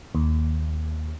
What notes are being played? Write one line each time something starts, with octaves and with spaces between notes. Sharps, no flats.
D#2